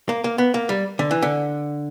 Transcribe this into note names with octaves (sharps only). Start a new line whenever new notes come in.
A#3
A#3
B3
A#3
G3
D3
E3
D3